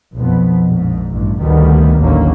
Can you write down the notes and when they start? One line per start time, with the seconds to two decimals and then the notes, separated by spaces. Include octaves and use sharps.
0.15 B1 F2 B3
0.66 A#1 G#2
1.09 A1 G2
1.39 D2 D#3 G3 B3
2.00 A1 D#2 D3 F#3 A#3 C#4